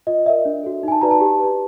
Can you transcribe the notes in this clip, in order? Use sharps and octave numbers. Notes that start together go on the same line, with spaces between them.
F4 D#5
A#4 D5 E5
D4
F#4 A4
D#4 G#5
A5
F#4 B4 D5 A#5
A5
G4
B4 D5